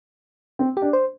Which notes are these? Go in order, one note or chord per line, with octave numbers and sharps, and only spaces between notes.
C4
D4 G4
C5